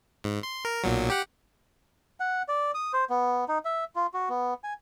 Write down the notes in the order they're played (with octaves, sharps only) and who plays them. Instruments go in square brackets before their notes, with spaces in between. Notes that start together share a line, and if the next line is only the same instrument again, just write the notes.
[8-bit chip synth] G#2
C6
A#4
B1 A#2 F#3
G4 F#5
[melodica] F#5
D5
D#6
C5
B3
D#4
E5
F4
F#4
B3
G#5